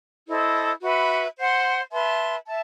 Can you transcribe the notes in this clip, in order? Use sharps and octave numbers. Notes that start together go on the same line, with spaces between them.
E4 A4 C5 D#5
F#4 B4 E5 B5
C5 F#5 C6
B4 E5 A5 C6
E5 A5